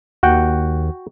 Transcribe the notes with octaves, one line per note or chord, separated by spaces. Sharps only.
D#2 F#4 F#5 G5